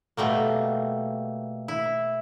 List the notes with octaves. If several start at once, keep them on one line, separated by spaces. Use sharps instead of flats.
B2 G3 A3 A#3
E4